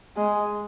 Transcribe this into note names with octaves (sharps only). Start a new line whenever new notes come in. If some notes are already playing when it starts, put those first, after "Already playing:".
G#3